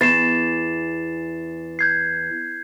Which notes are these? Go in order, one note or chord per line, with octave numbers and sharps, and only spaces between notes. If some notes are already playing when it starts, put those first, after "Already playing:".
E2 A6 C7 E7
G6 G#6 C7